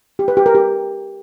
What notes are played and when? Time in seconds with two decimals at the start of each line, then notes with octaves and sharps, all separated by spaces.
0.19 G4
0.28 B4
0.37 G4
0.46 A#4
0.55 G4